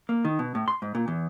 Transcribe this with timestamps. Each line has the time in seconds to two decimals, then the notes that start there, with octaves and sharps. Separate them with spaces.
0.09 A#3
0.25 D#3
0.39 B2
0.55 A2
0.68 C6
0.82 G#2
0.95 A#2
1.08 E2